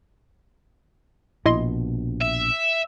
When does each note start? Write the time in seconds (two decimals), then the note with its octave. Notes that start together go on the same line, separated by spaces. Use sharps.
1.46 A#1 B2 E4 D#5 C6
2.21 E5